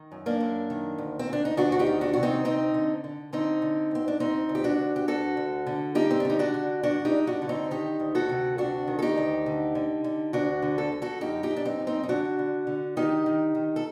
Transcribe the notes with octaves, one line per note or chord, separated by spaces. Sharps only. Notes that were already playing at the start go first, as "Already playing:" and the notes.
Already playing: D#3
F#2
A#3 D4
F#2
D#3
D2
C4
D2 D4
D#4
D2 D4 F#4
F#4
D#4 G4
D#3
D4 F#4
C3 F#4
C4 D#4
D2 C4 D#4
D3
D3
D3 C4 D#4
D3
D2 C4
D4
D2 C4 D#4
D2
G4
D4 F#4
D2
G4
D2 F#4 A4
D2
D3
G2 D#4 G4
C4
D4
D3 D#4
D4 F#4
D3
G2 D4 F#4
D#4 G4
G2
D4 F#4
D3
C4 D#4
D#3 D#4 G4
D2
F#4 A4
C3
D2 D4 F#4
D#3
A4
D#4 G4
D2
D3
D3
D3
D2 D4 F#4
D3
A4
D3
F#4 A4
F#2 D#4 G4
D#4 G4
F#2
D4
C4 D#4
F#2
C4 D#4
D#4
D3 D4 F#4
D3
D3
D#3 D#4 G4
D#3
D#3
A4